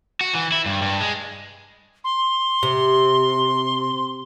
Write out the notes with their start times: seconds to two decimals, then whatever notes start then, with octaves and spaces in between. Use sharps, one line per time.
0.21 F#4
0.35 E3
0.52 E4
0.66 G2
0.82 G2
1.00 G#3
2.04 C6
2.63 C3